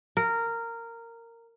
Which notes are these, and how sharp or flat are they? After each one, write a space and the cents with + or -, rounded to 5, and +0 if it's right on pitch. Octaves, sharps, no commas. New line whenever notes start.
A#4 -15